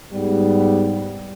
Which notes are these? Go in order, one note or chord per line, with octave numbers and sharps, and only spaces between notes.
G#2 G3 B3